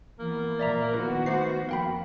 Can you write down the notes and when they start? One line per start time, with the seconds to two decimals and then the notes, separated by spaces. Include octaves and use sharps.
0.19 E3 A#3 B3
0.59 A#2 F3 A#4 D5 E5 A#5
0.93 D#3 B3 E4 F#4 B4
1.26 A3 B4 C5 C7
1.69 F2 A#3 F5 G5 B5